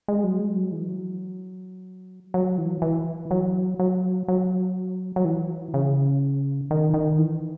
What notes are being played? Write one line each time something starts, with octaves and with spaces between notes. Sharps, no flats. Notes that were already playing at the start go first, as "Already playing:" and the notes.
G#3
F#3
G#3
F#3
E3
F#3
F#3
E3
E3
F#3
F#3
F#3
F#3
E3
C#3
D#3
D#3
E3